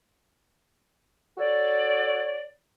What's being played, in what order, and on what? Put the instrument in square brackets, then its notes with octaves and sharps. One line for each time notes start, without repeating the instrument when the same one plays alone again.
[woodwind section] F#4 A4 C#5 D5